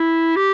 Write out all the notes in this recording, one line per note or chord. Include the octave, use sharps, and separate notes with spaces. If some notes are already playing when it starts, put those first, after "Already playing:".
Already playing: E4
G4